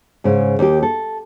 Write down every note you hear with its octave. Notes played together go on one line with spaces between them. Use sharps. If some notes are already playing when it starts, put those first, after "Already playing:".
G#2 C#3
D#2 G4
A4